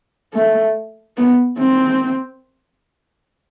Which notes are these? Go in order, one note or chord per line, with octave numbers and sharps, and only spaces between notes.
A3
B3
C4